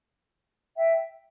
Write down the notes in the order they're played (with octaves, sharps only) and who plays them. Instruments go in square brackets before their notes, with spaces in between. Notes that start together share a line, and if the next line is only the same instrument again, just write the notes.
[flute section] E5 G5